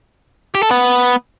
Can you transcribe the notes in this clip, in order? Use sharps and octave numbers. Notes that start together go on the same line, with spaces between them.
G4
A4
B3